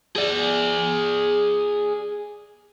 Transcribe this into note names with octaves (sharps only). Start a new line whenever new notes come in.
G#4 D5